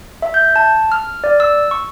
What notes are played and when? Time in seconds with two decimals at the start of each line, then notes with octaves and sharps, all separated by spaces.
0.22 E5
0.34 G6
0.56 A5
0.92 F6
1.24 D5
1.40 E6
1.71 C#6